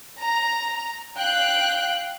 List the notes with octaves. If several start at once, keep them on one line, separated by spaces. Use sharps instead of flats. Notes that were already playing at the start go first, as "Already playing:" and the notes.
A#5
F5 G5 F#6